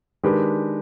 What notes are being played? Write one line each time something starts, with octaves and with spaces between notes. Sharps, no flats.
D#3 G#3 D4 G4 B4